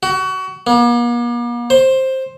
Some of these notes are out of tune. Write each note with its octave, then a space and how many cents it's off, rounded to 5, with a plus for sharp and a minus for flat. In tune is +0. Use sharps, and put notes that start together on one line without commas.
F#4 +30
A#3 +45
C5 +10